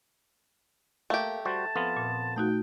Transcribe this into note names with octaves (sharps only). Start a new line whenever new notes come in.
A3 A#3 G4 F5
G3 F#4 C5 A5
F2 B3 F4
A#2
A3 D#4 F#4 G5